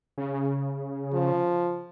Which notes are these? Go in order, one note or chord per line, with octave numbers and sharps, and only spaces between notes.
C#3
F3